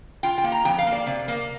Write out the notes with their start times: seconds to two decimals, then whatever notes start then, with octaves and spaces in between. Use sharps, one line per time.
0.23 F4 G5
0.38 G5
0.44 A#3
0.52 A#5
0.65 F2 G5
0.78 F5
0.87 A#3
0.92 D5
1.06 C3
1.28 A#3